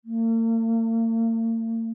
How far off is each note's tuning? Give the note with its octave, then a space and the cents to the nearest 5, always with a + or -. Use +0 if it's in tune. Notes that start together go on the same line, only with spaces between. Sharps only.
A#3 -45